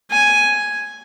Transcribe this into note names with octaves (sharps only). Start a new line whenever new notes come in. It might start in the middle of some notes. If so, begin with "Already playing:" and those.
G#5